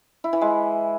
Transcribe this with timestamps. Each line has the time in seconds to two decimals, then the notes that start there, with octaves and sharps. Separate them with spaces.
0.24 E4
0.33 E3
0.41 G#3